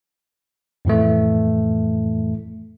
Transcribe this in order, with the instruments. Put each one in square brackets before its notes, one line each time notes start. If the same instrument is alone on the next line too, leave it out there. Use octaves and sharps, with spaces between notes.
[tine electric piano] F2 A2 E3 A3